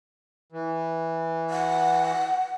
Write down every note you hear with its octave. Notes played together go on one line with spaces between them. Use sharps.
E3
F#5